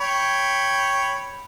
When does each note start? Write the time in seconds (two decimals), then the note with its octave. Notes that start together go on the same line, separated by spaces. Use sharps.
0.01 C#5 G5 B5